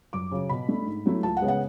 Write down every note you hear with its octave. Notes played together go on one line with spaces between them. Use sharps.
F#2 D6
C#3 F#3
B2 B5
A3 D4
G#2
F#3 A3 E4
C#2 A5
F#5
C#3 G#3 B3
F#5